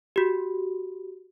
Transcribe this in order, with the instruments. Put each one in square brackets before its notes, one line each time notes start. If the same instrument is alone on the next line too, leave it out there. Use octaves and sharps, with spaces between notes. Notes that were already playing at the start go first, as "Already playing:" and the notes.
[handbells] F#4 G4